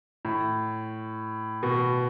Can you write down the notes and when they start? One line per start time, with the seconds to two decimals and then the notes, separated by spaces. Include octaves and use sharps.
0.25 A2
1.63 B2